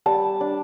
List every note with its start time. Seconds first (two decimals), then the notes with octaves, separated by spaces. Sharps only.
0.06 G3 A5
0.40 D4